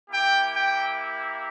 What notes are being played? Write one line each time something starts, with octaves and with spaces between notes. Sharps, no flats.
A#3 E4 G4 G5
G5